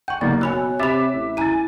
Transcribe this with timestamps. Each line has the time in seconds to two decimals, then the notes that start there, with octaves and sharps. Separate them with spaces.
0.08 F#5 C#6 G6
0.21 F#1 D#2 A#3 D5 A6
0.41 B2 C#5 G#5 B5 E6 F#6
0.80 C3 E5 B5 D6 A6 E7
1.13 A1
1.37 E4 G#5 A#5 A6 D#7